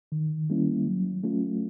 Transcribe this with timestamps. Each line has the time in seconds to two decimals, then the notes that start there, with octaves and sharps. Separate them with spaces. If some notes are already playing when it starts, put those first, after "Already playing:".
0.12 D#3
0.50 G3 A#3 C#4 E4
0.87 F#3
1.24 A3 C#4 F4